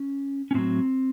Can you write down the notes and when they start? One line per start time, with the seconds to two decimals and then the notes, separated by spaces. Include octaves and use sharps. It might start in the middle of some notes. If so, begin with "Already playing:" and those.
Already playing: C#4
0.51 C#4
0.54 A2 F#3 C4